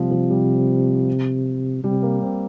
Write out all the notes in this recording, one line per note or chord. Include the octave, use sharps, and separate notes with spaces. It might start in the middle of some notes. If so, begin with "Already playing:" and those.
Already playing: C3 F3 G3
F3
G3
C3 G3
A#3
C4